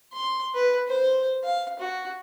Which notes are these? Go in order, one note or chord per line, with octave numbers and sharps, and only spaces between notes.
C6
B4
C5
F5
F#4